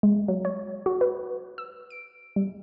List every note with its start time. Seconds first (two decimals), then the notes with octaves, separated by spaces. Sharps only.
0.03 G#3
0.28 F#3
0.45 C#5
0.86 F#4
1.01 B4
1.58 E6
1.90 D7
2.36 G3